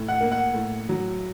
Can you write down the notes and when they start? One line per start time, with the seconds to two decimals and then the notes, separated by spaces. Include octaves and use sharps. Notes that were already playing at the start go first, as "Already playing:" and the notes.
Already playing: A2
0.08 F#5
0.21 A#3
0.32 F#5
0.54 A2
0.89 F#3